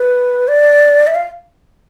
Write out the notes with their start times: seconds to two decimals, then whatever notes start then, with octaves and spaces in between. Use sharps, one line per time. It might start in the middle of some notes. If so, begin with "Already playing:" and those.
Already playing: B4
0.48 D5
1.07 E5
1.15 F5